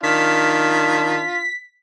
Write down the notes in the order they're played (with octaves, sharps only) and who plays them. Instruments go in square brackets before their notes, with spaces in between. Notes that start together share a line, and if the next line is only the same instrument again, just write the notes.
[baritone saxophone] D#3 [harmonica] D4 F4 [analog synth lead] B6